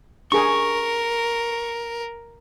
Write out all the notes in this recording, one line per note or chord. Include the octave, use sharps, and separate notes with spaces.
D4 G4 G#4 A#4 C#6